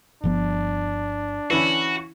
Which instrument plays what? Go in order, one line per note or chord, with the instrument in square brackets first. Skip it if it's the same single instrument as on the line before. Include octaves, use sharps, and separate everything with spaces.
[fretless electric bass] G1 F3 B3 [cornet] D4
[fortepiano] E3 C#4 E4 [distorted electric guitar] F#4